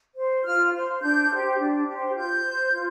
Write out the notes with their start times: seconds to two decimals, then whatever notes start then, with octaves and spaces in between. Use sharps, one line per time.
0.16 C5
0.44 F4 F6
0.74 C5
1.01 D4 G6
1.30 G4 C5
1.59 D4
1.87 G4 C5
2.15 F4 G6
2.44 C5
2.72 F4